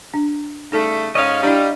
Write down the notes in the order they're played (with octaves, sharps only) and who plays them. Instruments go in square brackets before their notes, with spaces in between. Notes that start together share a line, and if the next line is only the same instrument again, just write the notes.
[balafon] D4
[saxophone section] C#3 G3 A3 [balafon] D#4 A4
[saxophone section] G#2 C#4 [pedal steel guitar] D#5 F5
[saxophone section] G3 [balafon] D4 E4